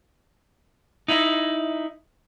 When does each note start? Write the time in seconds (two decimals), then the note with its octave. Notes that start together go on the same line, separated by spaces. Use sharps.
1.08 D#4 E4